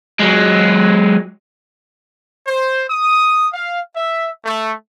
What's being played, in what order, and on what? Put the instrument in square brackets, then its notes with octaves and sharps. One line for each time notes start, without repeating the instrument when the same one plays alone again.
[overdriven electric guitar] F#3 G#3
[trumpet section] C5
D#6
F5
E5
A3